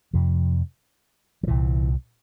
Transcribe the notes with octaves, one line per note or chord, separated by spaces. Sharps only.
F2 C3 F3
F3
C2 A#2 E3